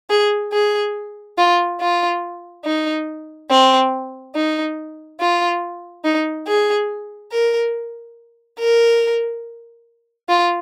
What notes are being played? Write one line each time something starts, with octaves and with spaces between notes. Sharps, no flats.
G#4
G#4
F4
F4
D#4
C4
D#4
F4
D#4
G#4
A#4
A#4
F4